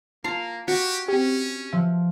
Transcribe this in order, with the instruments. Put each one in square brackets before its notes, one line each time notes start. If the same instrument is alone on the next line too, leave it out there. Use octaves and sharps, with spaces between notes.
[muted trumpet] A#3 [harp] F4 [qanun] F5 A#5 [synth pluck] A5
[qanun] F#4 [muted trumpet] G4
[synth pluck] C4 G4 [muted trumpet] C#4
[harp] F3 [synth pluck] E5